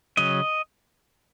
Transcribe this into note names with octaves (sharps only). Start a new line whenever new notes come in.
C#3 F#3 C#4 D#5